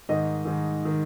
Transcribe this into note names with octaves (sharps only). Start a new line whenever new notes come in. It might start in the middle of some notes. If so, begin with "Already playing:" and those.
G#2 D#3 D#5
G#2 D#3
D#3